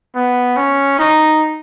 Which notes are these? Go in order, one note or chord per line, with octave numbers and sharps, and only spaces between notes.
B3
C#4
D#4